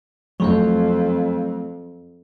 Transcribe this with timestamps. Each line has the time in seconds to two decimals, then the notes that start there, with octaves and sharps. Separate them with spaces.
0.40 F2 F#3 A3 C4